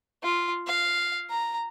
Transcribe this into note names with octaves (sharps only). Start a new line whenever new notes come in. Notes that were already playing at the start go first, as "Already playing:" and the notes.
F4
F5
A#5